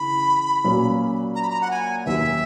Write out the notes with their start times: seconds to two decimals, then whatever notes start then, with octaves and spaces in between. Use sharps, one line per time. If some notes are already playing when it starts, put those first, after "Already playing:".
Already playing: C#3 E3 B5
0.64 A#2 F#3 A#3 C#4 F#4
1.35 A#5
1.42 B5
1.49 A#5
1.61 F#5
1.71 G#5
2.05 D#2 D#3 F#3 E5